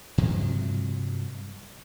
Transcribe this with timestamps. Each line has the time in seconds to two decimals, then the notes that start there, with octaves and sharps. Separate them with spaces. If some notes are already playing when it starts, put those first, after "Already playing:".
0.18 G2 C3 F3 F#3